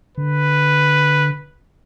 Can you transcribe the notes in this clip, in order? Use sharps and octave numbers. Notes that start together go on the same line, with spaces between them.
D3 B4